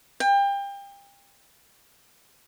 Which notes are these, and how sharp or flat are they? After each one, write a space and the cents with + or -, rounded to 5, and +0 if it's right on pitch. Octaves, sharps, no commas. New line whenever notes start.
G5 +30